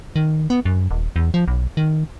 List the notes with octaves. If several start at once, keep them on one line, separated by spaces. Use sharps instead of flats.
D#3
B3
F#2
D#1
E2
F3
B1
D#3